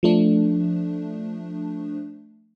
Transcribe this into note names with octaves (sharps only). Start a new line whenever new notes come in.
F3 A3 D4